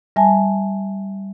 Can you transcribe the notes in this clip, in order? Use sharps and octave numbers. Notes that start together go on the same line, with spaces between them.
G3 E5 G#5 A5